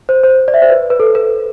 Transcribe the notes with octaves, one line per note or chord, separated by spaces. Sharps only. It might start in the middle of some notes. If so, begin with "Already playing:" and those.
C5
C5
D5
E5
C5
B4
B4
A4
B4